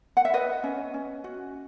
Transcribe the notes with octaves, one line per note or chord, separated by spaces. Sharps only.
F#5
E5
B4 D#5
C#4
C#4
F#4